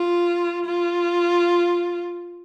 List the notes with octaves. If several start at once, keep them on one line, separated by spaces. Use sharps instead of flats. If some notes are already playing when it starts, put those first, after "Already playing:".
Already playing: F4
F4